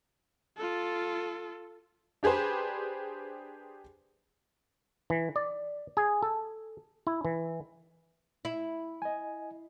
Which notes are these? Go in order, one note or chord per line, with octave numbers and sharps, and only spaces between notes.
F4 A4
D4 G4 G#4 B4 C5
E3
D5
G#4
A4
E4
E3
E4
D#5 G#5